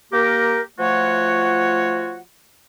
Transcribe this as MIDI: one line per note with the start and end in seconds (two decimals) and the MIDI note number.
0.12 0.60 58
0.12 0.60 67
0.12 0.60 70
0.78 2.19 53
0.78 2.19 57
0.78 2.19 65
0.78 2.19 66
0.78 2.19 73
0.78 2.19 78